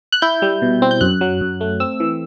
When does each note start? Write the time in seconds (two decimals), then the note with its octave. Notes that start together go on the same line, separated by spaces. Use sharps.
0.12 F#6
0.22 E4 G6
0.42 G3
0.62 B2
0.82 C4
0.91 G6
1.01 F#2 F#6
1.21 F#3
1.41 F#2
1.61 A3
1.80 C4 E6
2.00 E3